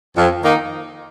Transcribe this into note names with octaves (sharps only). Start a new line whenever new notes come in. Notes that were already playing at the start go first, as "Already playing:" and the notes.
F2
D#3 A#3 D#4